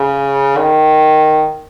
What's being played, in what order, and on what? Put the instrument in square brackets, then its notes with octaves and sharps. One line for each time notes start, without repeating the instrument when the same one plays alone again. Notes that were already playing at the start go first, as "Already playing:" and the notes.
Already playing: [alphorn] C#3
D#3